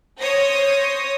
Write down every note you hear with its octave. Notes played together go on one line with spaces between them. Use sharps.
C5 C#5 D#6 A#6